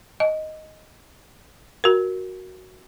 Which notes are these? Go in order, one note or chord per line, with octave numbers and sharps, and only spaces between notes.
D#5
F#4 A#4